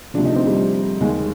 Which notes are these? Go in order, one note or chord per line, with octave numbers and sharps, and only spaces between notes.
D2 C3 F3 D4
D#4
C4
G3
D#2 D#3 G#3